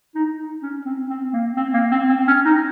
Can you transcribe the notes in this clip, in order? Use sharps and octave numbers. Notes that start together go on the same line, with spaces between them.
D#4
C#4
C4
C4
A#3
C4
A#3
C4
C4
C#4
D#4